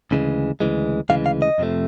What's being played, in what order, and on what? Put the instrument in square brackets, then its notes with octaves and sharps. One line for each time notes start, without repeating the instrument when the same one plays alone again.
[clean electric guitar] D2 C#3 E3 G#3
D2 C#3 E3 G#3
D2 C#3 E3 G#3 F5
F5
D#5
F2 C3 F3 A3